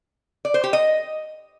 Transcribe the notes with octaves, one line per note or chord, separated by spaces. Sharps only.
D5
C5
G4
D#5